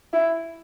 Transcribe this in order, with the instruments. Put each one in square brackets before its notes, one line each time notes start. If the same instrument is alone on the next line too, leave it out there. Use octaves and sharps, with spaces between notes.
[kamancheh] E4